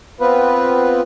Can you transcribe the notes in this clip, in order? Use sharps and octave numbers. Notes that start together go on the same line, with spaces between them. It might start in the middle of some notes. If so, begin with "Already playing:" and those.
B3 C4 F4 B4